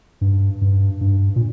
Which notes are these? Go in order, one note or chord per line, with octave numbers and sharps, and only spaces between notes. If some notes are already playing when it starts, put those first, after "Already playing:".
G2
G2
G2
A#2